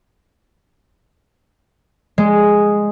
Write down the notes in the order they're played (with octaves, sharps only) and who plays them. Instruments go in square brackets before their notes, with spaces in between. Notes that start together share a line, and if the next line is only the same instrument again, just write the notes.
[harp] G#3